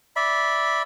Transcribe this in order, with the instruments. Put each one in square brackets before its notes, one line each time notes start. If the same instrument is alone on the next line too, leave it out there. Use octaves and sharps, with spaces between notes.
[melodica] D5 E5 B5